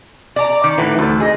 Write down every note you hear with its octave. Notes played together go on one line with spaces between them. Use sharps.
D5 A#5 D6
D#3
A2 D3 E3 B4
D2 A4
G#4 D#5